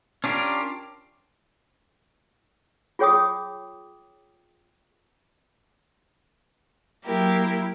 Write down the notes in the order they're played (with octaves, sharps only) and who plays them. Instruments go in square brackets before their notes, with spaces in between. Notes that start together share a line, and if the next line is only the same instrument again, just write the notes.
[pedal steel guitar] C#4 D4 F4 G4 A#4
[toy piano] F4 G#4 C#5 G5 D6 D#6
[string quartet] F#3 A#3 E4 G4 A#4